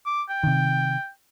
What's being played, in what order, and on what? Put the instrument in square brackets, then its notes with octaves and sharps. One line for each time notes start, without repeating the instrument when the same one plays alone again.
[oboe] D6
G5
[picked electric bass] C3 D#3